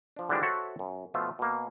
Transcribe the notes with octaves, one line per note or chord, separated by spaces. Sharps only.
F3 D4
D3 E3 F3 G3 G#3 D4
F#4 A4 C5 C#5 E5 F#5
F#2
B2 F3 A3 F4 E5
B2 A#3